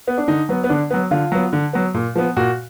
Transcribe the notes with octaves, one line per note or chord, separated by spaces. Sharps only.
B3
D4
D3 D#4
F#3 B3
B3
D3 D4
F#3 B3
D3 F4
F#3 B3
D3
F#3 B3
A#2
F3 B3
A#2 F#4